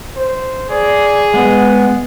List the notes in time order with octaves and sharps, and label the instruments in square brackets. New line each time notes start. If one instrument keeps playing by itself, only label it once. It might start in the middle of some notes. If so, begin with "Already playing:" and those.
[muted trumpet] C5
[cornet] G#4 [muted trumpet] D5
[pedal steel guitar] G#3 B3 [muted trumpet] F#5